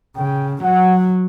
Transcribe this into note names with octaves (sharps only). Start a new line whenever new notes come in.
C#3 G5
F#3 F#5